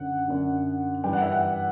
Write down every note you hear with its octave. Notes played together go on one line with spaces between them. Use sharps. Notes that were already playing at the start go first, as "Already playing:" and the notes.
Already playing: F#2 D3 F#5
F#2 D3
G2 E3 G5
F#5
E5
F#5